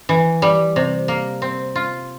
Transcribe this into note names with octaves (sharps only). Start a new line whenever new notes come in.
E3
G3
C3
A#3
C4
F4